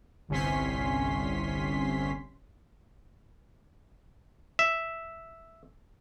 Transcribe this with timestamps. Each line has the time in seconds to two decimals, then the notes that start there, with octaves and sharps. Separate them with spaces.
0.29 G1 C2 C3 C#4 C6 B6
4.59 E5